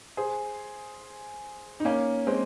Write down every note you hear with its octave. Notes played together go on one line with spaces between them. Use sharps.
G#4 C5
D#4
A#3 C#4
G#3 C4